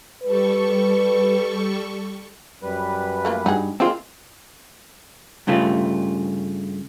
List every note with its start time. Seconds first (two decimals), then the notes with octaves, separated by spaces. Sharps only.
0.24 G3 A4 B4 C#6
2.63 F#2 G3 B4
3.25 A3 A#3 F4
3.46 G2 D#4 F#4 G#4
3.80 F3 G#3 A#3 C4 F4
5.47 G2 C#3 A3 F4